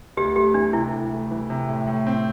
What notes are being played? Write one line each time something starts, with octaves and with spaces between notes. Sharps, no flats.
D2 G4
A3 G4
E3 D4
C3 E4
D2
A3
E3
C3
A2
A2
C4